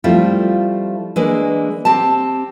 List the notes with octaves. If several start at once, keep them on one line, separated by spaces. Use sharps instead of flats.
F3 G3 A3 C4 E4 F4
E3 G#3 A#3 D4
C4 G4 A5